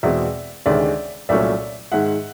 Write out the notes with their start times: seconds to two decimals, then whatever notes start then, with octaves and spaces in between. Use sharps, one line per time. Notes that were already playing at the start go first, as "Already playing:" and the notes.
0.03 E2 B2 G#3 C4 D5 E5
0.66 D2 C3 D#3 G#3 C#4 D5 E5
1.29 C2 A#2 F#3 A3 C#4 D5 E5
1.92 G#2 D#3 G#3 E5 F#5